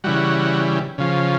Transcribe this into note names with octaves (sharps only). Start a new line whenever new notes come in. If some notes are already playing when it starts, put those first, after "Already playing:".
C#3 E3 G3 F#4
C#3 F3